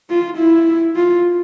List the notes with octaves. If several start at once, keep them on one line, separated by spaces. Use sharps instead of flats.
F4
E4
F4